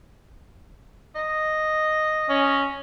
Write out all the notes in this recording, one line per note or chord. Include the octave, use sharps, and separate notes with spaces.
D#5
C#4